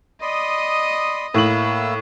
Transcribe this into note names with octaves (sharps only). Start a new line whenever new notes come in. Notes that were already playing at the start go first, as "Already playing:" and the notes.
D5 D#5 B5 C6 D#6
A2 A#3 E4 E6 F#7